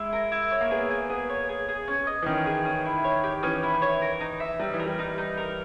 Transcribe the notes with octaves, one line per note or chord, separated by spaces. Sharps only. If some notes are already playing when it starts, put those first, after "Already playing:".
Already playing: G#3 E4
A#4
E4
C#5
A#3
B3 G#4
G#5
B3 G#4
C#5
G#4
G#4
C#4
D#5
E3
D#3 C#4
G#4
C#4
E4
C#5
G4
E3 C#4
E4
C#5
A#4
D#4
E5
G3 D#4
E3
A#4
G3
D#4
D#4
A#4